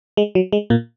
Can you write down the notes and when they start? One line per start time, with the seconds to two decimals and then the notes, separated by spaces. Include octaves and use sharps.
0.17 G#3
0.35 F#3
0.53 G#3
0.70 A#2 A#3